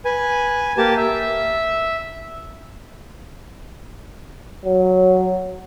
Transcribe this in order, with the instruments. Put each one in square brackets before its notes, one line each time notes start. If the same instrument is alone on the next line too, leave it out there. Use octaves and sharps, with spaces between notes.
[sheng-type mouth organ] B4 G#5
A#3 G4 A5
E5
[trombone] F#3